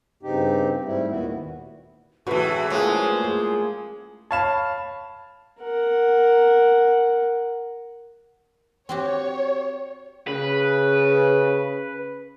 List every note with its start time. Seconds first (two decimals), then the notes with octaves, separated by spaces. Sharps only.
0.23 G2 C#3 C4 D#4 G4
0.85 G#2 G3 A3 C4 E4
1.10 D#2 A#2 D#3 B3 E4 F#4
2.27 F#2 A2 E3 G#3 F#4 A4 B4
2.70 A2 F3 G#3 A#3 G#4
4.31 C#5 F5 A5 B5 E7
5.61 A#4 F#5
8.89 C4 F#4 G4 C#5
10.28 C#3 B4